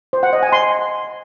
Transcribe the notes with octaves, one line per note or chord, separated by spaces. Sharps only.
C5
F#5
D#5
G#5
C6